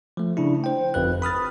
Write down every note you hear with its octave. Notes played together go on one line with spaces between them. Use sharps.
F3 A3
C#3 D4 E4
C5 G5
G1 F2 B4 F#6
B5 D#6 F6 A6